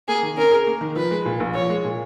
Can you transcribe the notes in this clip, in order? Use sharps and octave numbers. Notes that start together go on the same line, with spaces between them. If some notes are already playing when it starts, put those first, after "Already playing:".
A#3 G#4
D#3
C#4 A#4
G#4
A#3
D#3
F3 B4
G#3
A#2
A#1
F3 C#5
G#3
A#2